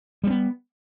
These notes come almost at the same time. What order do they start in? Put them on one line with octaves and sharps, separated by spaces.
G3 C4 B3